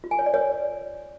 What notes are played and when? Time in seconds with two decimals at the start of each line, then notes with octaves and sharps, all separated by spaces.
0.04 F4
0.11 G#5
0.19 C#5
0.26 D5
0.34 C#5